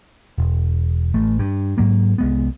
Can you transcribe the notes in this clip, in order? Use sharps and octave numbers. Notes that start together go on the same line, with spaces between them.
E1
A1 A3
G2
G#2 F#3 A#3
C2 G#3 B3